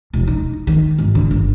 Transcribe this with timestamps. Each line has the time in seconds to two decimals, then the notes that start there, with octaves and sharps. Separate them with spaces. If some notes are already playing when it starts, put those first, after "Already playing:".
0.14 E1
0.28 D#4
0.67 D#3
0.99 G#1
1.15 D3
1.31 G1